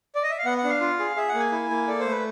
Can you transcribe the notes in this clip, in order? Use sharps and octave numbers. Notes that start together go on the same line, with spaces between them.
D5
D#5
E5
F5
B3 F#5
F#5
D4 F5
F4
G#4
G#4 E5
F#5
A#3
G#5
E4
A#3
A4 D5
C5
A3
B4